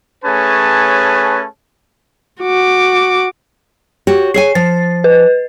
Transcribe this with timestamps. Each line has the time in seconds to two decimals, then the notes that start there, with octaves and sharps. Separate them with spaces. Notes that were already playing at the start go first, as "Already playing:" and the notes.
0.24 A3 C#4 G#4 B4 C#5 A5
2.42 F#4 D6
4.07 F#4 G4 C#5
4.34 G#4 C#5 G#5 C7
4.55 F3 A6
5.04 B4